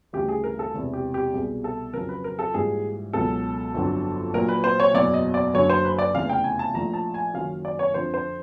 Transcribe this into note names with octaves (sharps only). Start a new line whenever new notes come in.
D2 C#3 E3 G3 G4
G#4
A#4
A4
E1 E2 C3 E3
G4
G4
C2 B2 G3 G#4
A4
F2 C#3 F#3 A#4
B4
A#4
A4
A#1 G#2 E3 G3 G#4
C#2 B2 F#3 A4
G1 F2 D3 F#3
A#1 A#2 F#3 A#4
B4
C5
C#5
F#1 E2 B2 F#3 D5
D#5
D5
F#1 F#2 D3 F#3 C#5
C5
B4
D5
F1 E2 C#3 E3 F5
G5
G#5
A5
A#1 A2 F3 A#5
A5
G#5
F#1 F#2 D#3 F5
D5
C#5
F2 D3 F3 C5
C5